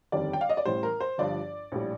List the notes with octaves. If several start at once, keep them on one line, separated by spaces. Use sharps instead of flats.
G1 F2 D#3 G3 D5
G5
F5
D#5
D5
A1 A2 G3 C5
A#4
C5
G1 G2 F3 D5
A#1 A2 G3